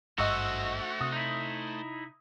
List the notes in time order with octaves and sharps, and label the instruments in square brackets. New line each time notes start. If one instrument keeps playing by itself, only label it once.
[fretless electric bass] G#1 G2 [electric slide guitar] A3 C5 [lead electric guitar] F#4 [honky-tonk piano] D#5 C#6 E6
[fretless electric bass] C3 [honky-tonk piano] D#6
[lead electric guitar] D#4 E4